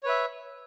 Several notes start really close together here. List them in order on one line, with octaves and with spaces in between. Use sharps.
C#5 B4 E5